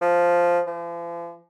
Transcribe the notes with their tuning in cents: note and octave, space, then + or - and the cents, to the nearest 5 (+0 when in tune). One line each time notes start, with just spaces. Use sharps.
F3 +0
F3 -40